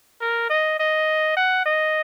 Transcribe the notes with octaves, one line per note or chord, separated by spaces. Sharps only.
A#4
D#5
D#5
F#5
D#5